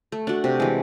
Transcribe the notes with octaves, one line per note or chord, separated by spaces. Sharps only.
A3
D4 F#4
C3
E3 G#3